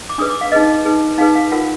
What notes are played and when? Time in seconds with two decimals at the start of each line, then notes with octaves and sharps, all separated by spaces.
0.09 D6
0.18 D4 G#4 B4 D#6
0.30 D6
0.41 F5
0.52 D#4 G#4 B4 D#5
0.85 D#4 G#4 B4
1.18 D#4 G#4 B4 F5
1.35 F5
1.52 F4 A#4 F#5